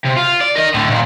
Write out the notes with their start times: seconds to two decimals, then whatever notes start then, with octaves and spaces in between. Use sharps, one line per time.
0.04 C3
0.17 F4
0.41 D5
0.56 A#4 D#5
0.74 A2 D3
0.90 A#2 D#3